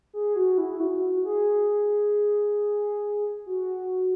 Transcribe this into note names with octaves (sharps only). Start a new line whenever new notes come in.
G#4
F#4
E4
F#4
G#4
F#4